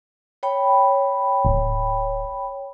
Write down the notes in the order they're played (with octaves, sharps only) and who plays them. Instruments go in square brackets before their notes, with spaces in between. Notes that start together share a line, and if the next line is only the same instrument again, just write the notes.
[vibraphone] C#5 G5 B5
[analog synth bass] D1